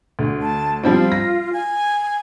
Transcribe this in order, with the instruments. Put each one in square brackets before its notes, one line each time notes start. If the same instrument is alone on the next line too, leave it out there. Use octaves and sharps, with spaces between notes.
[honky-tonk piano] D2
[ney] A5
[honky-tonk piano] F3 G3 C4 [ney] F4
[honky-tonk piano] A#6
[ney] G#5